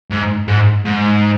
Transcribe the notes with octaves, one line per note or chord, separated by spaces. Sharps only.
G#2
G#2
G#2